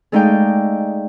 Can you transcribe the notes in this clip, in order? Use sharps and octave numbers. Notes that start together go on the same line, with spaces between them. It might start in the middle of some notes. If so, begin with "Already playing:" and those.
G#3 A3 D#4 D5 F5 G5